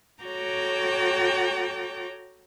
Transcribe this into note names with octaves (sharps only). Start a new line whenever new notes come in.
F#4 A4 C#5 G5 A#5 D6